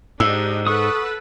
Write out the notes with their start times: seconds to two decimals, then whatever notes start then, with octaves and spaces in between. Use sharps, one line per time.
0.20 G#2 D4 D#4 G4 E6
0.67 A4 B4 F#5 C#6 D#6